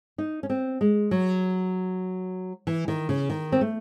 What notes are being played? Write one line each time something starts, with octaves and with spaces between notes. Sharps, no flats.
D#4
C#4
C4
G#3
F#3
E3
D#3
C#3
D#3
C4
A3